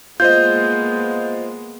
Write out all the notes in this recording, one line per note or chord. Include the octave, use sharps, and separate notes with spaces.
G#3 A#3 B3 F4 C5 D#5 G6